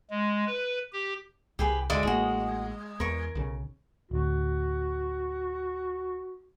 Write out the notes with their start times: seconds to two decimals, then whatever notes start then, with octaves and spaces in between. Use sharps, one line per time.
0.10 G#3
0.47 B4
0.93 G4
1.59 C2 G4 G#4 B4
1.90 D2 D3 G#3 D5 E5 D6
2.03 A1 A2 A#3 F#4 G#4
3.00 E2 A#4 C#6
3.35 B1 C#3
4.11 D1 D2 F#4